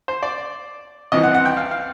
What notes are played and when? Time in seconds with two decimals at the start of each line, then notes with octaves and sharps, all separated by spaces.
0.08 C5
0.23 D5
1.12 C2 C3 E3 D#5
1.23 F#5
1.34 F#5
1.45 G5
1.57 F5
1.71 F5